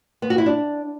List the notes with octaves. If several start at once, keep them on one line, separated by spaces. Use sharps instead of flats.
B3
F#4
E4
D4